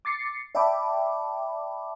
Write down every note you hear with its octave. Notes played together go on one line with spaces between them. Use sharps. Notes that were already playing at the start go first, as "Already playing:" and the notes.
D6 A6 C7 C#7
D5 E5 G5 A5 B5 D6